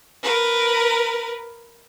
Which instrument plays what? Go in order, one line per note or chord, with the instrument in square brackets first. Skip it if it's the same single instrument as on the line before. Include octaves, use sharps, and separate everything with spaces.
[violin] A#4 B4